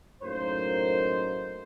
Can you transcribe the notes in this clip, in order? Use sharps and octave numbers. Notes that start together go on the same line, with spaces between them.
F#2 A2 A#3 D#4 C5